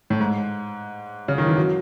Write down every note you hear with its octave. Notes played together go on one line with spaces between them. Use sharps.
A2
G#2
C#3
D#3
E3
F#3